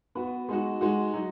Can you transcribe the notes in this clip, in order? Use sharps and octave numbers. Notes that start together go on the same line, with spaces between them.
B3 F#4 B4
G#3 D#4 F#4
G#3 D#4 F#4
F#3 D#4